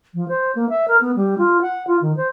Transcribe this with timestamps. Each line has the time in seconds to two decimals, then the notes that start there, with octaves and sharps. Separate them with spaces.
0.14 F3
0.28 C5
0.55 A#3
0.69 E5
0.87 A#4
1.01 B3
1.16 G3
1.38 F4
1.61 F#5
1.87 F4
2.01 D#3
2.16 C5